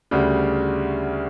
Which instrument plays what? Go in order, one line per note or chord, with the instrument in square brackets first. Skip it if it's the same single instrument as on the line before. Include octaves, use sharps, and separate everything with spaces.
[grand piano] D2 C#3 G3 D4 F#4